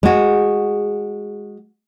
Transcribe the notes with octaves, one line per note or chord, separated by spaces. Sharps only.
G#3 F#4